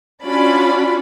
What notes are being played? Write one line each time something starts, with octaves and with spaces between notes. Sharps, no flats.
C#4 D4 F4 F#4 D5 B5